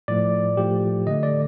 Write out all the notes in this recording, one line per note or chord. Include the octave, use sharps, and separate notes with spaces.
A2 F3 A3 D5
A2 F3 A3 G4
D3 A3 D#5
D5